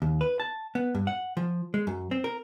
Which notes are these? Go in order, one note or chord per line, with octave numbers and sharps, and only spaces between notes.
D#2
B4
A5
B3
G2
F#5
F3
G#3
F#2
C4
A#4